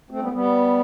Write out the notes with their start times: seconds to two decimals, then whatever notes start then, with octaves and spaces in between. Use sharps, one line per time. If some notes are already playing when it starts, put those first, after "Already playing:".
0.10 A3 C4
0.21 G3 B3
0.32 G3 B3